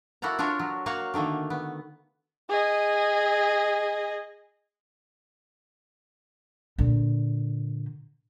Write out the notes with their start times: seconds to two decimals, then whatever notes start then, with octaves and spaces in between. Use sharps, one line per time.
0.22 A#3 E4 F#4 A4 F#5 A#5
0.39 D4 F4 A4 A#4 C#5
0.59 F#3
0.86 A#3 F#4 C#5 F5 F#5
1.14 D3 D#3 A3 A#3
1.50 B3
2.49 G#4 D#5
6.78 A#2 D3